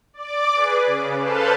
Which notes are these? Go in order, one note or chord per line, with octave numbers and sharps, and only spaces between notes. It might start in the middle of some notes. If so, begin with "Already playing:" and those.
D5 D6
G#4 B4
C#3
A4 B4 C5 F5 A5